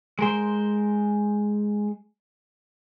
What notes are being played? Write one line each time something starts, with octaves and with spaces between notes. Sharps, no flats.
G#3 A#4 C5